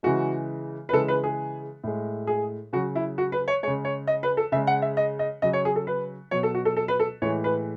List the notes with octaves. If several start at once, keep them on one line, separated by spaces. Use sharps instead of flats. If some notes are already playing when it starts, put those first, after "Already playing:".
C#3 E3 G#3 F#4
B4
C#3 E3 G#3 A4
B4
G#4
A2 G#3
G#4
C#3 F#3 F#4
E4
F#4
B4
C#5
C#3 G#3 C#5
C#5
D#5
B4
A4
C#3 G#3 E5
F#5
E5
D#5
D#5
C#3 F#3 D#5
C#5
G#4
A4
B4
B2 F#3 C#5
A4
F#4
A4
A4
B4
A4
A2 E3 G#3 C#5
B4